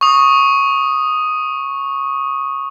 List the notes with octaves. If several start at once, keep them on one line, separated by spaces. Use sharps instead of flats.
C#6 D#6